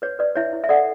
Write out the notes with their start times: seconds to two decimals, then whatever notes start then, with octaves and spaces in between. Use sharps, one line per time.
0.02 B4 C#5
0.19 B4 D5
0.35 E4 C#5 E5
0.53 E4
0.64 E5
0.69 A4 D5 F#5